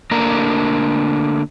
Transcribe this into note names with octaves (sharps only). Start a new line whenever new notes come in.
D3 A3 A#3 D4 A#4 A#5